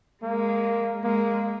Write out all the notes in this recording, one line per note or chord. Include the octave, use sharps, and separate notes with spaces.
G#3 A#3
G#3 A#3